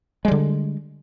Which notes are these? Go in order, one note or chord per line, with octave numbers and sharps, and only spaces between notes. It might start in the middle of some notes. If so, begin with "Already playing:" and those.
D3 G3 G#3